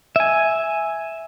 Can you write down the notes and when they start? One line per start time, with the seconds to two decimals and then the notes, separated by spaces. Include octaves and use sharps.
0.16 E5 G#5